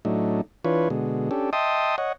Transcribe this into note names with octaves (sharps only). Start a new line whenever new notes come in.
A2 F#3 A3 D4 D#4
E3 D4 F4 B4 C#5
B2 D3 G#3
C#4 D4 G4 A4
D#5 E5 G5 A5 C6 D#6
C#5 D#5 F#5